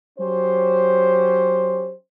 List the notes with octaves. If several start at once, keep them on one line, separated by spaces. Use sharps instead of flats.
F#3 C#4 G4 C5